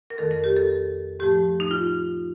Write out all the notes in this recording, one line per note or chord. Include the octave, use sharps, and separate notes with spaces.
A#4
F2 D#3 A3 A4
A#4
G4
A4
A2 F3 A3 G4
D#4
F4